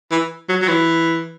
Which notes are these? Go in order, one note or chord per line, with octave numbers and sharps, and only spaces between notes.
E3
F#3
F#3
E3